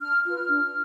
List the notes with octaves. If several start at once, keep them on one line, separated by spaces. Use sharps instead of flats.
D4 F6
F4 B4 F6
D4